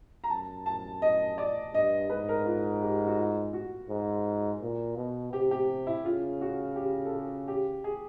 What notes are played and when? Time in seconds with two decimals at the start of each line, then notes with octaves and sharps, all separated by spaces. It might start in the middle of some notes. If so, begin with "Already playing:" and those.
0.24 A#5
0.30 F#2 A5
0.66 A5
1.02 D#5
1.38 D5
1.74 G2 D#5
2.10 G#2 B4
2.29 A#4
2.46 F4
2.82 G4
3.07 F#4
3.18 F4
3.53 F#4
3.89 G#2
4.61 A#2
4.97 B2
5.33 C3 G4
5.51 G4
5.87 E4
6.04 C#3 F4
6.41 F#4
6.76 G4
7.05 A4
7.12 G#4
7.48 G4
7.84 G#4